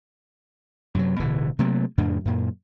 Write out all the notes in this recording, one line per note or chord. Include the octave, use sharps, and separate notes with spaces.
F#2 C3 F#3
D1 B2 D3 E3
C3 F#3 A3 A#3
F2 A2 C#3 D4
F#2 A#2